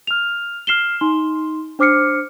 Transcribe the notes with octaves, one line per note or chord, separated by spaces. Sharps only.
F6 F7
F6 C7 E7 G7
D#4 C6
D4 C5 D6 F6 C7 C#7